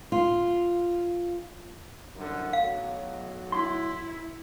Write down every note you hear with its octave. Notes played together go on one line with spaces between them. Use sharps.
F4
C2 F#2 D3
B1 A2 F#3 F5
E4 C6